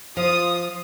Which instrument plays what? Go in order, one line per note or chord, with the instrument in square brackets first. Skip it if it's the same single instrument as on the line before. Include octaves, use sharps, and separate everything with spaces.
[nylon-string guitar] F3 [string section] F4 D#6